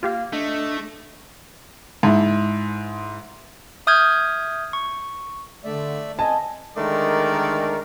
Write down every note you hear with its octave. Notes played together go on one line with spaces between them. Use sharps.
A#3 F4 G4 F5
A3 D4 D#5
G#2 E4
E5 D#6 F6 G6 G#6
C#6
D3 A3 D5 E5
C4 D#5 G#5 A5
D3 D#3 G#3 A3 A#4 D5